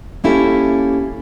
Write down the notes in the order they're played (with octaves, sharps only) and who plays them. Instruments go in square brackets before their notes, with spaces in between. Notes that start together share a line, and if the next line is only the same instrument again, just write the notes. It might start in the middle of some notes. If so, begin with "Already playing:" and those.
[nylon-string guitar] A#3 C#4 E4 G4 A4